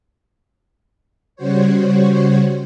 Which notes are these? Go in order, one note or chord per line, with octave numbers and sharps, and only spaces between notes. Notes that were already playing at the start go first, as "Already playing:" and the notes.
C#3 G3 F#4 C5 C#5